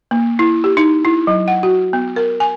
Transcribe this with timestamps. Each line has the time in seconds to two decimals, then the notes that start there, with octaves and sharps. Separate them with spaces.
0.11 A#3
0.39 E4
0.64 G4
0.77 D#4
1.05 E4
1.27 F#3
1.48 F#5
1.63 F#4
1.93 B3
2.16 A#4
2.40 G#5